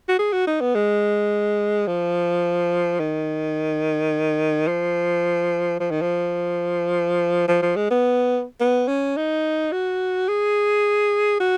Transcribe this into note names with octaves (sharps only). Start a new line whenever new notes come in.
F#4
G#4
F#4
D#4
B3
G#3
F3
D#3
F3
F3
D#3
F3
F3
F3
G#3
B3
B3
C#4
D#4
F#4
G#4
F#4